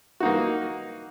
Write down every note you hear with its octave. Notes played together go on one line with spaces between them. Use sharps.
A#3 D#4 F#4